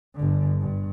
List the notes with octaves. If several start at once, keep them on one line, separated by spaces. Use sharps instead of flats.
G1 D3
G2